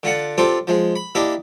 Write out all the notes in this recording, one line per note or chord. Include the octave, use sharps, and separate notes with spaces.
D3 F4 F#5 A5
C4 D4 F4 G4 A4 C5
F3 G#3
B5
A#3 D4 E4 G4 D#5 E5